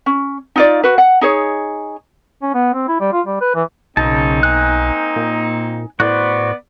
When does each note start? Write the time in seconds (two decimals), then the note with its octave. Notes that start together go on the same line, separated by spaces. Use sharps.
0.06 C#4
0.56 D#4 F4 D5
0.83 F#4 B4
0.98 F#5
1.21 D#4 G#4 C#5
2.42 C#4
2.54 B3
2.73 C4
2.88 E4
3.00 G3
3.12 F4
3.26 G3
3.41 B4
3.54 E3
3.97 B1 C#3 A#3 C4 D#4 A5
4.43 G#5 F#6
5.16 A#2
6.00 A2 B3 F#4 C5 D5